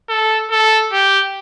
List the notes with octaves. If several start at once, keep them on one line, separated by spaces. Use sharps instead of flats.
A4
A4
G4